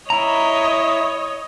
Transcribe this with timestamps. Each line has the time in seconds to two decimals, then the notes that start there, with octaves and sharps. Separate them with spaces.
0.10 E4 C#5 D#5 A#5